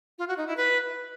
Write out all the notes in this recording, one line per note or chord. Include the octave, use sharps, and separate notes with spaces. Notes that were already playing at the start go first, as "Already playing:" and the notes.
F4
F#4
D#4
E4
B4